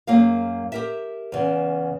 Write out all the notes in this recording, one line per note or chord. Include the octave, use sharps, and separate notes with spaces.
F#2 A#3 G#4 F5
G4 A#4 E5
E2 C#3